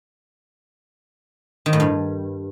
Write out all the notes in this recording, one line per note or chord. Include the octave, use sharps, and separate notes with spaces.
D#3
A2
G2